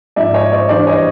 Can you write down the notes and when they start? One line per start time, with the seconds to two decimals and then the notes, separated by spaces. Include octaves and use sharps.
0.16 G#2 F3 D5 E5
0.34 C#5 D#5
0.52 C5 D5
0.69 G2 E3 G3 C5 D5
0.87 C#5 D#5